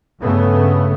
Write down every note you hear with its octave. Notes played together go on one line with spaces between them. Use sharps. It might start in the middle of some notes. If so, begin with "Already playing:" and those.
G2 C#3 A3 B3